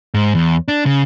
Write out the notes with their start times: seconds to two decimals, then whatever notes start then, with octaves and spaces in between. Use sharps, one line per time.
0.14 G#2
0.35 E2
0.68 D4
0.86 C#3